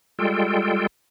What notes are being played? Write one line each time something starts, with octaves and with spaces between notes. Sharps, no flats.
G3 G#3 F4 A4 G5